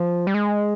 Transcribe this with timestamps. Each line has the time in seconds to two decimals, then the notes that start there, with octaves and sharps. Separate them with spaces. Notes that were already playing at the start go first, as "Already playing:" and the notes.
Already playing: F3
0.27 G3
0.34 G#3